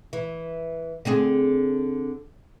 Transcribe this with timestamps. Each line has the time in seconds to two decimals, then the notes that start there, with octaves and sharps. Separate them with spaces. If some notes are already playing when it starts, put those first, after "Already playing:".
0.13 E3
1.05 D3 C4 G#4